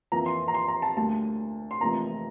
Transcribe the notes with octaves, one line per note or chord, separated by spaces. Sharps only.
F2 E3 A#3 A#5
C6
A#5
C6
A#5
A5
D2 D3 G3 A#3 A5
C6
F1 F2 E3 A#3 A#5